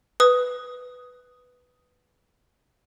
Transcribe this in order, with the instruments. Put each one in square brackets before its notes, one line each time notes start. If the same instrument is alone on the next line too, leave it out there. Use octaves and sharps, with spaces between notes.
[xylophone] B4 D#6